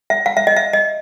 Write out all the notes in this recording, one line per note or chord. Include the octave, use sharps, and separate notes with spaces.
E5
F5
E5
D#5
E5
D#5